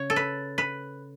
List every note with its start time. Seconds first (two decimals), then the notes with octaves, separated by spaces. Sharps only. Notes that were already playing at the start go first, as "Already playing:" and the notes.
Already playing: C#3 C#5
0.10 A4
0.16 B4
0.58 B4